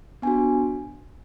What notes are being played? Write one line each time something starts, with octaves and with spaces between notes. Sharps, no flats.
B3 D4 F#4 G#5